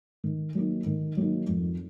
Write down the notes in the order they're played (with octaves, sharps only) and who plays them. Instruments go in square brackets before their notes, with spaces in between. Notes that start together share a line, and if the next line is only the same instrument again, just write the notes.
[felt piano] D#3
F#3 A#3 D#4
D#3
F#3 A#3 D#4
F2